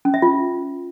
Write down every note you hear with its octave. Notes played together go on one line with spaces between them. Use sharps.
C#4
E5
F4